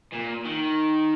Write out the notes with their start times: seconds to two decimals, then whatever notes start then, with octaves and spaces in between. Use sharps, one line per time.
0.13 A#2
0.45 D#3